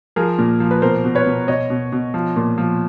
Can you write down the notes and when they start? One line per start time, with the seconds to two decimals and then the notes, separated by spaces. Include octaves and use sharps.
0.16 F3 G#4 A#4
0.39 A#2
0.60 F3
0.71 B4
0.82 B2 A#4 C5
1.04 B2
1.15 B4 C#5
1.26 B2
1.48 B2 C#5 D#5
1.70 B2
1.92 B2
2.14 F3
2.36 A#2
2.58 F3